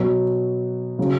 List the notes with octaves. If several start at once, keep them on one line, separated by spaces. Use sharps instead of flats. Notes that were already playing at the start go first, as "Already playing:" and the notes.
Already playing: B2 F#3
C#3 F#3